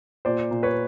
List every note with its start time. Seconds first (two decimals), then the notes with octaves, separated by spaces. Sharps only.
0.25 A#2 C5 D5
0.51 A#2
0.63 B4 C#5